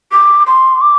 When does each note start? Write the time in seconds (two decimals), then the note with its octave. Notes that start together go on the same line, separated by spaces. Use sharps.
0.12 D6
0.47 C6
0.81 D6